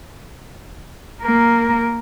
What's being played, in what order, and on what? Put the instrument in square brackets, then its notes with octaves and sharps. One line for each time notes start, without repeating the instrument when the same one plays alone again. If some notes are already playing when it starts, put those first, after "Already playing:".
[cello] A#3 A#4